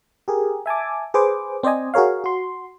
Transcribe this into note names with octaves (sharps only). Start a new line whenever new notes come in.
G4 G#4 A#4
E5 G#5 A5 D6
G#4 B4 C5 D6
C4 C5 D5 D#5 G#5
F#4 G#4 A#4 C#5 F5
F#4 C6